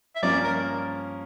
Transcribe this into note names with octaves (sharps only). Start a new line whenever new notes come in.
E5
G2 F3 A#3 C#4 D5
A#4